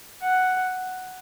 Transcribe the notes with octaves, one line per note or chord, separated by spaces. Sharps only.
F#5